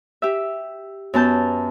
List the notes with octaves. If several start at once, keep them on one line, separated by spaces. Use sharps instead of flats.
G4 E5
F#2 B3 A5 G6